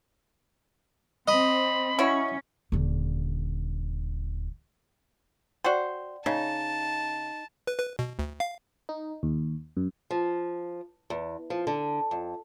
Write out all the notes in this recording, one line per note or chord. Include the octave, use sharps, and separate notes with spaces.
C4 D#5 B5
C#4 E4 F#4 C#5
D#1 D3
F#4 C5 D5 F#5 G5
C#3 D#4 A5
B4
B4
B2
D2
F5
D#4
D#2
F#2
F3
E2
F3
D3
F2